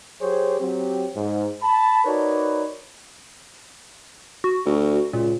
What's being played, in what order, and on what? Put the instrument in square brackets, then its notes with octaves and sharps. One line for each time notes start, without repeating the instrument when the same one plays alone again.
[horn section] F#3 G4 G#4 C5 C#5
F#3 C4 G4
G#2
A5 B5
D#4 F#4 A#4 B4 C#5 D5
[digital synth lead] F#4
[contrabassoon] D2
[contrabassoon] C#2 [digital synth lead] A#2